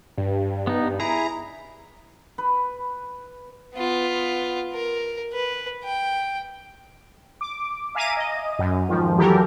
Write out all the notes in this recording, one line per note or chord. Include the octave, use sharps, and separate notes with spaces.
G2
B3 D#4
E4 G#4 A#5
B4
B3 F4
A#4
B4
G5
D6
E5 F5 G#5 A#5 D6 D#7
D#5
F#2
F2 G#2 D#3 F3
E3 F#3 G4 A4 A#4